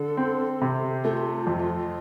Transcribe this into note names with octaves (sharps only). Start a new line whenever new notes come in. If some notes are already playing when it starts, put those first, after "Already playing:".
Already playing: D3 A4
C4
C3
A3 F4
F2